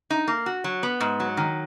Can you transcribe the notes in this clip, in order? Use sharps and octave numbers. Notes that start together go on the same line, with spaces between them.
D#4
A#3
F#4
F#3
B3
G#2
F#3
D#3